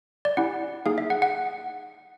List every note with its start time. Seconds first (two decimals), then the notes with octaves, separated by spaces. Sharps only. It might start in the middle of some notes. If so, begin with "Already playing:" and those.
0.25 D5
0.37 C#4 E4 G4 F#5
0.86 A#3 D#4 G#4 F5
0.98 E5
1.10 F#5
1.22 F#5